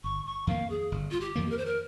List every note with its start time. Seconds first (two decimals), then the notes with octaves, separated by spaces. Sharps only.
0.04 G1 C#6
0.26 C#6
0.47 F2 D#3 A#3 F5
0.70 G#4
0.92 G1
1.11 F4
1.20 G4
1.36 F2 D#3 A#3
1.50 A#4
1.58 C5
1.66 A#4